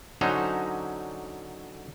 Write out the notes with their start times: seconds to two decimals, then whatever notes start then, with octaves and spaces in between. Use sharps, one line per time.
0.21 D3 F#3 C#4 D#4 C5 A#5